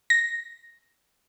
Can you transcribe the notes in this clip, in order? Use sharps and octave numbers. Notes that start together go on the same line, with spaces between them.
A#6